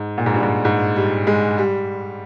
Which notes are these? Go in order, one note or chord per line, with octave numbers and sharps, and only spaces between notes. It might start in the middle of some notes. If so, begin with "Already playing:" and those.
Already playing: G#2
A#2
G#2
G2
G#2
G#2
G3
G#3
G3